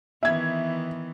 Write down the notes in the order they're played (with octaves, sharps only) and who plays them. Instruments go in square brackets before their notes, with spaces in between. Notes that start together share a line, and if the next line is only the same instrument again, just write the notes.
[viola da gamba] D#3 E3 B3 [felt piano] E5 G#6